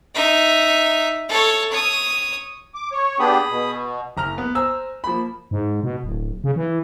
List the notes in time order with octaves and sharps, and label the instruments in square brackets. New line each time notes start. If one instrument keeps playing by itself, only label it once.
[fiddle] D#4 E5
A4 C#5
C#5 D#6
[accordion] D6
C#5
[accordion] B3 D4 G4 [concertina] G#4 B5 D#6
[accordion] B2
[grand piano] F#1 A#5 F6 F7
B3
C5 G#5 A#5 E6
F3 A#3 B5
[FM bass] G#2
B2
D1
C#3
E3